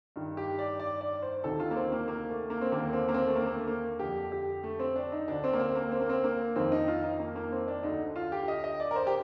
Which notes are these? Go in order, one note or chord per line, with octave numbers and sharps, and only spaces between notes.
G2 D#3
G4
D5
D5
D5
C5
D2 C3 D#3 A4
F4
A#3
C4
A#3
A#3
A3
A#3
C4
D#2 D3 A#3
C4
A#3
C4
A3
A#3
A#3
A3
A#3
F2 D3 G4
G4
A3
C4
D4
D#4
D2 D3 D4
C4
A#3
C4
A#3
C4
A#3
C4
A#3
F2 D#3 C4
D#4
F4
D#4
A#3
A#3
C4
D4
D2 D3 D#4
F4
G4
D#5
D#5
D5
A#4
C5
G4